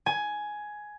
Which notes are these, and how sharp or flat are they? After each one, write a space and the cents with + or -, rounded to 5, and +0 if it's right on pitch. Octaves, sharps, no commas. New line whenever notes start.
G#5 +10